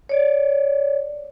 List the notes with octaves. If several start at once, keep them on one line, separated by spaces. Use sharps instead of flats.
C#5 D5